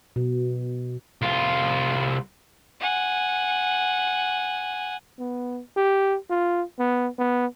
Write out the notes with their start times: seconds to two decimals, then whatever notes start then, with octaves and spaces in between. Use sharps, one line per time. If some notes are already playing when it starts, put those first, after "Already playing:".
0.16 B2
1.22 C2 F4
2.80 F#5 G#5
5.19 B3
5.76 G4
6.30 F4
6.79 B3
7.18 B3